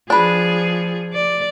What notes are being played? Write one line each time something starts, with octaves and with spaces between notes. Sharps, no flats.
F3 D4 G#4 B4
D5